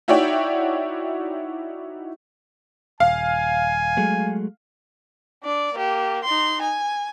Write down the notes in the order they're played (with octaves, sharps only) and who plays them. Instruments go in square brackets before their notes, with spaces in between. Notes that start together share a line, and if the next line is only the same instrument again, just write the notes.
[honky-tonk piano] D#4 E4 F#4 C#5 D5 G5
[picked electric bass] D#1 [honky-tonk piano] F5 [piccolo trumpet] G#5
[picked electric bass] F#3 G#3 A3
[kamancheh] D4 D5
A#3 G4
D#4 C6
G#5